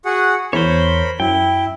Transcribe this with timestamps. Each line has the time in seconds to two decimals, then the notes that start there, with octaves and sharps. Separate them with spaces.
0.05 F#4 G#4 F#5
0.53 E2 A#4 C5 C#5 B5
1.20 F#2 E4 G5